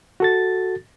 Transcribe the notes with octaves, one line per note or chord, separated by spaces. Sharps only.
F#4 A4 A6